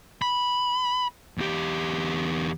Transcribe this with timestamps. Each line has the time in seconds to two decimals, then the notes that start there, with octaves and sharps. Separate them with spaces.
0.22 B5
1.38 E2 G4